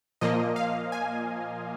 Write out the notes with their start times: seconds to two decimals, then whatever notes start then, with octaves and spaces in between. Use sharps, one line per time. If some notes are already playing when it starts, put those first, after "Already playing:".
0.21 A#2 F3 A#3 D#5
0.56 F5
0.92 G#5